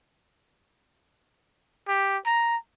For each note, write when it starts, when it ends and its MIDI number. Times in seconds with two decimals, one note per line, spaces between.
1.88 2.17 67
2.26 2.57 82